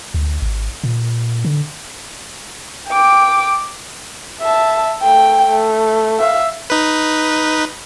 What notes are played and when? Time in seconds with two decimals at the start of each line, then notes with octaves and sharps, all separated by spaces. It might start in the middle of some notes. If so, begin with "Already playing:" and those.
0.14 D2
0.42 G#1
0.84 A#2
1.45 D3
2.88 G5 D6
4.41 E5 A5
5.02 A3 G5
5.49 A3
6.19 E5 F5
6.70 D#4 B4